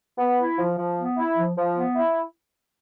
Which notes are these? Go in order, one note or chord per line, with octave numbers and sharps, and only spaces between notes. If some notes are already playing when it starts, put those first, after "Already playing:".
B3
E4
F3
F3
B3
E4
F3
F3
B3
E4